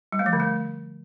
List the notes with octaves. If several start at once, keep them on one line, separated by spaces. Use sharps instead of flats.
G3
A3
F3
D3
A3